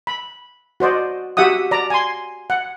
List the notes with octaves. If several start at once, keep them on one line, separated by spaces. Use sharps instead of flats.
B5
F#4 C5 D5 D#5
F#4 G4 E5 F#5 D#6
D5 A#5
G#5 C6
F#5